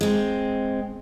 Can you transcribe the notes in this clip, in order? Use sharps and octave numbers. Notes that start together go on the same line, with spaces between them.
G#3 C4